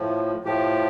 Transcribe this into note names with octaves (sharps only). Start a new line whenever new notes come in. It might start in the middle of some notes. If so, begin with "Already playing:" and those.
Already playing: A2 F3
A2 F3 G4